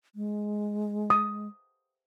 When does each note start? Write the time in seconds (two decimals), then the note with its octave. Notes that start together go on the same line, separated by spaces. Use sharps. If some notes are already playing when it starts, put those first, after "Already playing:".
0.15 G#3
1.10 D#6